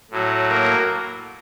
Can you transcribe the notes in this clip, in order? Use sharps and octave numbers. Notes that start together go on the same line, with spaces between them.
A2 F#3
A#3 A#4